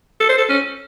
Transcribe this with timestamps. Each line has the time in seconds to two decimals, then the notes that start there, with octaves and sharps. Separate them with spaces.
0.20 A4
0.29 C5
0.38 A4
0.49 C#4